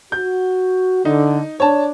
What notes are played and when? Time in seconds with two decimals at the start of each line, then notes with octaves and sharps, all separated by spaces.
0.12 F#4 G6
1.05 D3 D#4
1.60 D4 C#5 A5